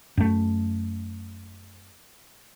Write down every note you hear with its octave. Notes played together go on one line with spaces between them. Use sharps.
F#2 A3